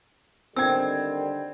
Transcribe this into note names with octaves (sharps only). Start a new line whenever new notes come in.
D3 D#3 G3 C4 G5 E6 G#6